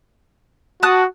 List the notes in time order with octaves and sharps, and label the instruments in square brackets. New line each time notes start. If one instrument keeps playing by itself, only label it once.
[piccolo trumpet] F#4 [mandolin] A5 D#6 F#6